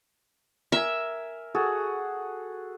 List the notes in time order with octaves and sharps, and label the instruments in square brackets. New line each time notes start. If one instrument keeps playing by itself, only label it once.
[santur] A#4 G#5 [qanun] E5
[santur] F#4 G#4 A4